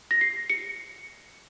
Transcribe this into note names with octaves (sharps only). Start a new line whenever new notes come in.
A#6
C7
C#7